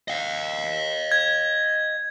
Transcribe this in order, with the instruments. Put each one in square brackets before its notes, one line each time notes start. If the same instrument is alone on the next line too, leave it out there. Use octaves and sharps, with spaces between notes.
[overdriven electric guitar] D#5 F5
[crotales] G#6